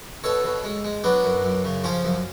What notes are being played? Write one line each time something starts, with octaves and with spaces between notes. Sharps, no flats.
B2 A4 C#5
B2
G#3
G#3
F#3 B3 D4
F#2
F#2
C#3
F3 C#4 F4
F#2